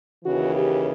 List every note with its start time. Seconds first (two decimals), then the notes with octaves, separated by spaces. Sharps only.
0.24 D#2 C#3 E3 F#4
0.54 G4